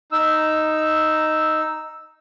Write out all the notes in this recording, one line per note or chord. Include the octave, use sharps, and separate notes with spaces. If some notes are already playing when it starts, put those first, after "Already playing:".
D#4 E6